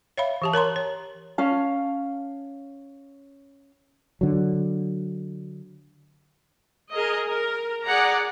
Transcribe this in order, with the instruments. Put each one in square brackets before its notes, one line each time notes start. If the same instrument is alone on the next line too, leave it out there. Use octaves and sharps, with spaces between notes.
[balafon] C#5 E5 F5 B5
E3 G4 A5
A#4 C#5 A#5 C6
C#5
[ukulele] C#4 F5 A5
[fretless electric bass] D3 F#3
[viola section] G#4 A#4 D#5
A#4
G#4 D5 F#5 A#5